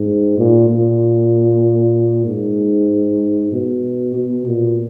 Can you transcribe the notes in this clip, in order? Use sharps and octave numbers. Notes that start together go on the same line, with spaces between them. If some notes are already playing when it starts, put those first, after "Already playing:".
Already playing: G#2
A#2
A#2
G#2
B2
B2
A#2